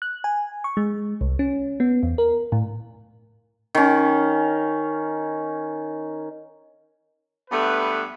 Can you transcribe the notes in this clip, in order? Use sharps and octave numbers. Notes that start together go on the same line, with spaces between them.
F#6
G#5
C#6
G#3
C2
C#4
B3
E2
A#4
A2
D#3 C#4
G2 A3 B3 B4